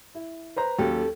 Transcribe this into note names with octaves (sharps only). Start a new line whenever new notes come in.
E4
B4 C5 A#5
D#2 F#3 C#4 G4 A4